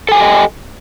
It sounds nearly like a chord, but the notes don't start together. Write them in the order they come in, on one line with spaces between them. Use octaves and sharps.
A4 G#5 G4 G5 D#5